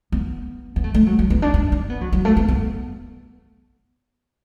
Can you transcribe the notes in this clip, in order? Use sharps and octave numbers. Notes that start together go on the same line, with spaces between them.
B3
B3
A3
A3
F#3
F#3
B3
D4
D4
D4
B3
F#3
F#3
A3
B3
B3